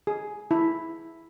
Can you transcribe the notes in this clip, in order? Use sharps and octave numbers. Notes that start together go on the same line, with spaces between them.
G#4
E4